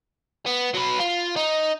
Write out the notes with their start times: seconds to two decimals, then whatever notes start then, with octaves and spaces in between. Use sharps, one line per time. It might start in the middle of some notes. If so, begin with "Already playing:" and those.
0.46 B3
0.74 F#3 B4
0.99 F4
1.36 D#4